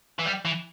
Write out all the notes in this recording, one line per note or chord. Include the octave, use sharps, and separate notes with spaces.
E3
G3
E3